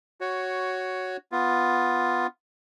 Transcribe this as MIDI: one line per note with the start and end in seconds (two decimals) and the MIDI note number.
0.21 1.17 66
0.21 1.17 73
1.32 2.27 59
1.32 2.27 65